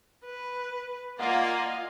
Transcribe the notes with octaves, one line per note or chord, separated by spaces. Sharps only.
B4
A#3 F4 D5 D#5 F5 F#5 G#5 C6